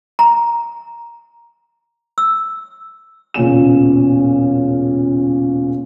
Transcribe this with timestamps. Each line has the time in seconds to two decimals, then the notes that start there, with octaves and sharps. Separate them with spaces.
0.19 A#5
2.18 E6
3.34 E1 A#2 C#3 C#4 E7